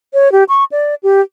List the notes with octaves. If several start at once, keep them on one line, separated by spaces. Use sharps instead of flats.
C#5
G4
C#6
D5
G4